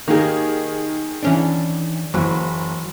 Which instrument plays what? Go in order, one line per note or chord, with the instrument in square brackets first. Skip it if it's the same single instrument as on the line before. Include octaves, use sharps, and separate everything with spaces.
[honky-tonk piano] D#3 G#4 [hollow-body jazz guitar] A#3 D#4 G4
[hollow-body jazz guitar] E3 C#4 D4
[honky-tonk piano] F#1 [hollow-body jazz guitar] E3 F#3